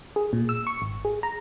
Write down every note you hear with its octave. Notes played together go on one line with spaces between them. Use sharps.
G#4
A#2
E6
C#6
G#1
G#4
A#5